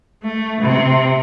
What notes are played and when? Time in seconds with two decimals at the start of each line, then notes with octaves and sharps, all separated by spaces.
0.23 A3
0.61 C3